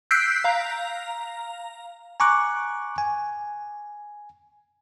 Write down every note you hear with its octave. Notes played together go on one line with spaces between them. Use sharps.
E6 F#6 G6 B6 C7 D7
F5 A#5
G#5 A#5 C#6 D6 F#6
G#5